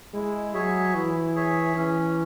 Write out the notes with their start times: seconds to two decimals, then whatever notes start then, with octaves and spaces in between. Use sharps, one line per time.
0.13 G#3 E4
0.54 F#3 G#4 C#5 E5
0.94 E3 E4
1.35 G#4 C#5 E5
1.76 E3 C#4